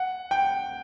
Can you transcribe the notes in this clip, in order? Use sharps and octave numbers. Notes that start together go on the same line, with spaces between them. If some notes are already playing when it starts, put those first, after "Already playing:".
Already playing: F#5
G5